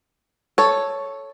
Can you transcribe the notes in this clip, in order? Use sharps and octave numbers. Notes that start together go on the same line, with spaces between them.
A4 C#5